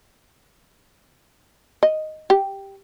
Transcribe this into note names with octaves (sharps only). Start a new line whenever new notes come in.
D#5
G4